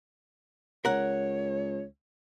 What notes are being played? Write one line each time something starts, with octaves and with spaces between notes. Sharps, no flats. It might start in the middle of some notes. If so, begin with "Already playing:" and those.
C#2 A#4 C#5 F#5